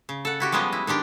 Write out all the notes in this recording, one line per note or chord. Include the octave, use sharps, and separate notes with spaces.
C#3
A4 F#5
E4 F#4 G4
F3 G3 G#3 B3 C#4 D#5
E4
D#3 G#3 D4 G4